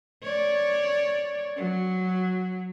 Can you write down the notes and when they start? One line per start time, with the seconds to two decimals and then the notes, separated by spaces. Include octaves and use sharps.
0.23 C#5 D5
1.56 F#3